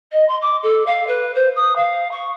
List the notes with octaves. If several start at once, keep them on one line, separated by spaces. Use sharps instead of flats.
D#5
C6
D6
A4
F5
B4
C5
D#6
F5
C#6